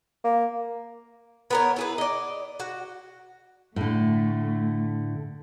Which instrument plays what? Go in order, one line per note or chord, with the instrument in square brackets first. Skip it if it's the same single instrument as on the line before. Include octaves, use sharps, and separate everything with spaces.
[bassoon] A#3
[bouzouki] B3 A#4 C#5
E4 G#4 B4
D5 D#5
F#4
[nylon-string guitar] A2 D3 [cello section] A3